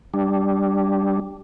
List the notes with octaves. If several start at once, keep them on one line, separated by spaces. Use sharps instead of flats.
G3 D4